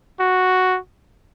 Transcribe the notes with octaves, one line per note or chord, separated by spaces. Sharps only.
F#4